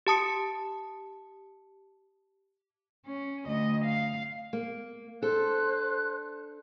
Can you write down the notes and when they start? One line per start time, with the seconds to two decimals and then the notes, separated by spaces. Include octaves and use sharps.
0.07 G4 A5 D#6 C#7
3.07 C#4
3.47 D2 D#5
3.85 F5
4.53 A#3
5.22 D4 A4 C5 F#6